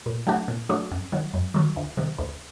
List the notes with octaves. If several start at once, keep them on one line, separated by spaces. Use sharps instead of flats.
A#2
F#3 A3 D4 F#4
A#2
F#3 A3 D4 F#4
F#2
D#3 F#3
F#2
D#3 F#3
D2
C3 D#3
D2